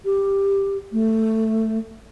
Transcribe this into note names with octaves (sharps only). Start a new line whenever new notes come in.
G4
A3